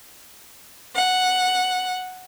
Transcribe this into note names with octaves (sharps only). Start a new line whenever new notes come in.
F#5